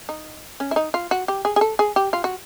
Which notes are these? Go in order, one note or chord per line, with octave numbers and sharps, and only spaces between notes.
D#4
C#4
E4
D#4
F4
F#4
G4
G#4
G#4
A4
G#4
G4
F4
F#4